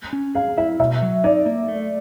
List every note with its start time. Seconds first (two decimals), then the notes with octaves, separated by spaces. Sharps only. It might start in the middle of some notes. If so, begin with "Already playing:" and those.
0.13 C#4
0.35 G#4 F5
0.58 E4 E5
0.79 B2 E5
1.02 F#3
1.24 D#4 D5
1.46 A#3
1.68 A3